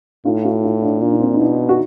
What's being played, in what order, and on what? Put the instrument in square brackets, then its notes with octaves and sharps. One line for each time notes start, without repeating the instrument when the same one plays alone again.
[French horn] A2 [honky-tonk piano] D#4 F4
[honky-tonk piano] E4 F#4
D#4 F4
D4 E4
[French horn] A#2 [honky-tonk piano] D4
[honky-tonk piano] D#4
C4 D4
D#4
[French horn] B2 [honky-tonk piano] D4 E4
[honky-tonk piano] F#4